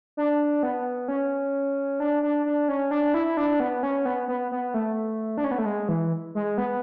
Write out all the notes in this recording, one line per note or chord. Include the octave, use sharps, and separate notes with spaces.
D4
B3
C#4
D4
D4
D4
C#4
D4
E4
D4
B3
C#4
B3
B3
B3
A3
D4
C#4
B3
A3
G#3
E3
G#3
B3